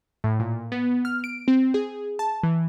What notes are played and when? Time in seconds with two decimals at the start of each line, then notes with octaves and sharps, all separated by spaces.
0.24 A2
0.40 A#2
0.72 B3
1.05 F6
1.24 D7
1.48 C4
1.74 G#4
2.19 A5
2.43 E3